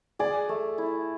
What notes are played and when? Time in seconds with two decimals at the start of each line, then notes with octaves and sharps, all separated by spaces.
0.19 G#4 D5
0.49 A3
0.78 E4